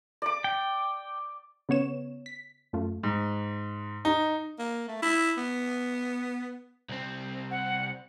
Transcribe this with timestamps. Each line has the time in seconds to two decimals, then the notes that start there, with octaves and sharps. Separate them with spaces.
0.22 D5 D6
0.44 G5
1.69 C#3 B3 C#5 E7
2.26 B6
2.73 F#2 A3 F4
3.03 G#2
4.05 D#4
4.59 A#3
4.88 A3
5.02 E4
5.37 B3
6.89 C2 C4
7.51 F#5